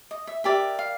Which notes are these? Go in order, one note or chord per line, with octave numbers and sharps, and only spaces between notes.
D#5
E5
G4 A#4 D5 E5
F5